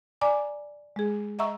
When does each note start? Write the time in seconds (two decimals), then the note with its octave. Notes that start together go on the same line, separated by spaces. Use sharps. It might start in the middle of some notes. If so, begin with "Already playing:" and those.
0.21 D5 G#5 A#5 D6
0.96 G#3 G#4
1.39 D#5 E5 F#5 A#5 C#6 E6